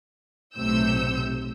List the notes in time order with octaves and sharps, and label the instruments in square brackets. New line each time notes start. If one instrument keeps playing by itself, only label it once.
[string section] B1 A2 C3 E6 G6